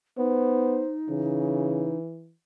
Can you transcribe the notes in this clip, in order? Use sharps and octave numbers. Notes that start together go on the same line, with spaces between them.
B3 D#4 C5
C#3 E3